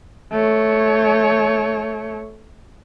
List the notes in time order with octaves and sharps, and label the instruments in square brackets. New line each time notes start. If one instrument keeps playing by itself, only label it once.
[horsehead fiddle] A3 C#5